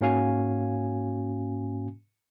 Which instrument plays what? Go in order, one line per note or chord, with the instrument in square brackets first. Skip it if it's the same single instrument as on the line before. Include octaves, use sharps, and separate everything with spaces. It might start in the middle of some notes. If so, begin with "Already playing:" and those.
[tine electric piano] G#2 A#3 C#4 F#4 F5 G#5